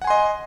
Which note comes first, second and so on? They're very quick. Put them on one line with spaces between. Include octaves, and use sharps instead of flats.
F#5 G#5 C6 D#5